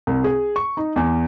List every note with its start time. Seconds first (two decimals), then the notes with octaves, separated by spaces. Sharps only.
0.07 C2
0.24 G#4
0.56 C#6
0.77 D#4
0.96 E2